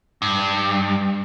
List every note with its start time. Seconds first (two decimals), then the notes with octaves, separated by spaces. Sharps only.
0.22 G2